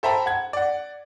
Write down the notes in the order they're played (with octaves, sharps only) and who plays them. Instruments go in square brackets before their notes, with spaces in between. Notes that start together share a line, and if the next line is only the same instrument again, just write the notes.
[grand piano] A4 C5 E5 G5 A#5 B5
F#5 G#6
D5 F#5